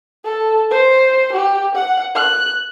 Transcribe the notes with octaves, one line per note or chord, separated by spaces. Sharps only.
A4
C5
G4
F#5
F#6